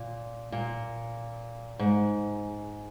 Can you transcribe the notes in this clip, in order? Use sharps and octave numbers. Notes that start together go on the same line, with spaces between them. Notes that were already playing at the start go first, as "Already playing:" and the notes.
Already playing: A#2
A#2
G#2